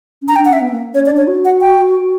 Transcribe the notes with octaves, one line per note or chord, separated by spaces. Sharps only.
C#4
D4 A#5
G5
D4
F#5
C#4 E5
B3
A#3
C#4 C#5
D5
D4
C#5
F#4
F#5
G5